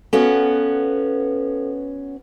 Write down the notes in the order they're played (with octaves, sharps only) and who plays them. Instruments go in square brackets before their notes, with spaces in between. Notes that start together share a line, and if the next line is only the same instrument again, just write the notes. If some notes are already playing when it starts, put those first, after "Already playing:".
[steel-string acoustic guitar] B3 C#4 F#4 [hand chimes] A4 F5